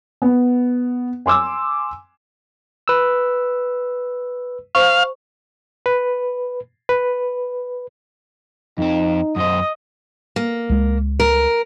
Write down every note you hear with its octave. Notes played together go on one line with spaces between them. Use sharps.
B3
G#5 C6 D6 E6
B4 E6
C5 F5 C#6
B4
B4
F2 C4 D#4
F#2 C5 D#5
A#3
C#2 G#3
A#4